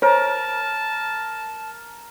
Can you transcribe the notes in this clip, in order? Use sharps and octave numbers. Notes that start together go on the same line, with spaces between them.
A#4 C5 C#5 A5